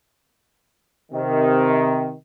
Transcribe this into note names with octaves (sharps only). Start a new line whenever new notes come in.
C3 D#3